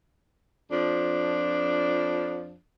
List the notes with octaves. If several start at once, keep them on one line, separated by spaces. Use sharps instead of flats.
F2 F3 D4